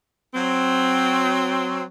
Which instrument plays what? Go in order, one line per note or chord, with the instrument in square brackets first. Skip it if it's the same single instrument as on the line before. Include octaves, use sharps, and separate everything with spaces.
[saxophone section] F#3 C4